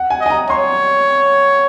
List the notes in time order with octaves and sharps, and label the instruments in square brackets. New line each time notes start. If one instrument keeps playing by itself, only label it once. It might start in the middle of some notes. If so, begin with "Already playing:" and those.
Already playing: [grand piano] F#5
G#5
[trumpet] D#5
[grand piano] G#5
A#5
[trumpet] C#5 [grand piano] C6